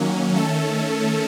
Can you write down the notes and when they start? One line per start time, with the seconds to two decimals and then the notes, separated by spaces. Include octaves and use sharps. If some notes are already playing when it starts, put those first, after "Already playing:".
Already playing: D#3 F#3 A#3 C#4
0.35 D#3 A3 C#4 A4